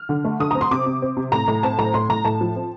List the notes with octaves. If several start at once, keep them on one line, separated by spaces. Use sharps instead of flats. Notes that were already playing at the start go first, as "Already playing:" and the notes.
Already playing: F6
D3
A3
D3 D#6
C4 A#5
C6
C3 D6
C3
C4
C3
A2 A#5
A2
C4 A5
A2 A#5
A2 C6
A2 A#5
A2 A5
F3
C4